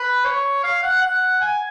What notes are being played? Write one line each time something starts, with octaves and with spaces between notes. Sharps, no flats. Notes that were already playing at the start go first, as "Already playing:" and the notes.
Already playing: B4
C#5
F5
F#5
F#5
G#5